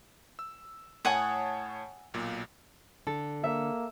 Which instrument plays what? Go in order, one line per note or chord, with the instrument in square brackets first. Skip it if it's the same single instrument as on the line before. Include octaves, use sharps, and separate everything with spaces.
[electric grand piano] E6
[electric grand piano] A2 C#5 A5 [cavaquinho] F#5 G#5 D#6
[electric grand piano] B1 A#2
[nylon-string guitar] D3 [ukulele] A4
[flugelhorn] A#3 [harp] E5